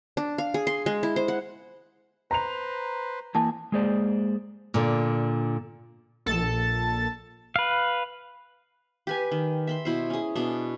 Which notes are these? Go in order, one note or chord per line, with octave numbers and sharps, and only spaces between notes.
D4
F5
G#4
C6
G#3
E4
C5
F#5
B4 C5 A#5 F7
E3 A#3 G#5 A5
G#3 A#3 G#4 C5 D5
A#2 D3
A#1 A4 A5
B4 F5
G4 B4 G#5
D#3
E5 B5 C6
B2 E4 C5
C#4 G#4
B2 D4